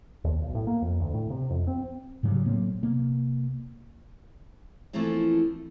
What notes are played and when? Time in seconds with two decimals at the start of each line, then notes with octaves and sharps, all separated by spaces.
0.24 D#2
0.42 B1
0.55 A2
0.67 A#3
0.82 F2
1.00 D2
1.14 A2
1.30 C3
1.50 F2
1.67 C4
2.23 G#2 C#3 F#3 G3
2.45 A2 F#3 A#3 C4
2.82 C3 A#3
4.93 E3 F3 A3 A#3 C4 E4